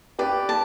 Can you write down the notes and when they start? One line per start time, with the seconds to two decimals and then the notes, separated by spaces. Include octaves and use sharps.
0.19 G4 B4 D5
0.49 A5